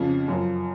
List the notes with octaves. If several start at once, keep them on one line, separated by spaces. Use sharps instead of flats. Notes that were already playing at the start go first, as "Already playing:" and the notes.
Already playing: F2 C#3 F3
F#2 F3